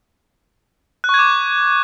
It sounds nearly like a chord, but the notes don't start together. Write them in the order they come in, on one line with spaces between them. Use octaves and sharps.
F#6 C#6 G#6 D6